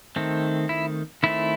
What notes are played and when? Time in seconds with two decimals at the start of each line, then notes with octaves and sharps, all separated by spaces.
0.16 D#3 A3 C4
0.69 E4
1.23 D#3 A3 C4 E4